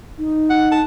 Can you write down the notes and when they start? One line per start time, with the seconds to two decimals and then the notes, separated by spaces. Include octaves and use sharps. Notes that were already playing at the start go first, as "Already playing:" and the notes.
0.18 D#4
0.50 F#5
0.71 A5